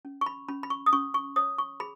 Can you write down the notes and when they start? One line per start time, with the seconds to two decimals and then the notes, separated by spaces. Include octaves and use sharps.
0.05 C#4
0.21 C#6
0.26 B5
0.48 C#4 B5
0.63 B5
0.70 C#6
0.86 D#6
0.93 C#4 C#6
1.14 C#6
1.36 C#5 D#6
1.58 C#6
1.80 G#4 B5